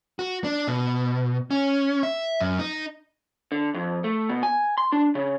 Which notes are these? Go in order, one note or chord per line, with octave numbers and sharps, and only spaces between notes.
F#4
D4
B2
C#4
E5
F#2
D#4
D3
F2
A3
B2
G#5
C6
D4
C#3